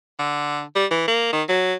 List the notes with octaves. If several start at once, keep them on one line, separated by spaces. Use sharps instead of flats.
D3
G3
E3
A#3
D#3
F#3